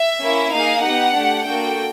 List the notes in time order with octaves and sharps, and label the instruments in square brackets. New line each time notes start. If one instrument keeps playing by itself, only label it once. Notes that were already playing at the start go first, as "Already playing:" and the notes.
Already playing: [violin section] E5
A#3 C#4 E4
A#3 D#4 G#4 F5
B3 D#4 G4 F#5
A3 D4 G4
A#3 D4 F#4 A4 G5